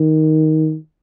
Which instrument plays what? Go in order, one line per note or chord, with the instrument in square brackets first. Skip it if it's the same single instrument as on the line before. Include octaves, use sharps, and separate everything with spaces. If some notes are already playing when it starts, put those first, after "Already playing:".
Already playing: [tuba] D#3